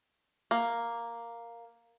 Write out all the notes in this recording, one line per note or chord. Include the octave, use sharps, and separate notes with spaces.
A#3